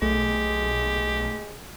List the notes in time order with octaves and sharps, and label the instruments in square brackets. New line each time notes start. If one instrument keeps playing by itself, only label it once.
[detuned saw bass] B1 [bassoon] G#3 [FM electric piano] A3 [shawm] G4